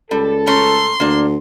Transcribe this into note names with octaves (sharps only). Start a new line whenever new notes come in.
C#2 G3 A4
A3 C#4 A#5 C6
D2 A#3 D4